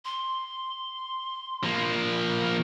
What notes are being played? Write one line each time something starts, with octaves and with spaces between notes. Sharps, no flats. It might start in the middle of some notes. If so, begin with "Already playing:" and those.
C6
F3 A#3